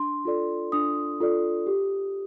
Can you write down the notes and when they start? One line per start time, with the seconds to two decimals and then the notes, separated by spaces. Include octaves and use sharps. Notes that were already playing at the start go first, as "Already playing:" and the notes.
Already playing: D4 C6
0.25 F4 A4 D5
0.72 D4 D#6
1.20 F4 A4 D5
1.67 G4